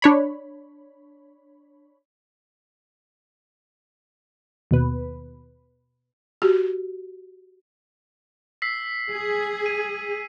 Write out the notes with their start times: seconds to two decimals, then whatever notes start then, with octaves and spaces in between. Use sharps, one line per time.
0.02 D4 C#5 B5
4.71 D#2 B2 B4
6.42 F#4 G4
8.62 E6 B6 C7
9.12 G#4
9.66 D#7